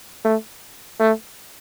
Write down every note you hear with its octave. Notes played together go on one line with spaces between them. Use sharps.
A3
A3